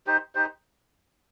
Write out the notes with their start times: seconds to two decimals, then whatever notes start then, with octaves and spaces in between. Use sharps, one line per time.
0.07 D#4 G4 C5
0.35 D#4 G4 C5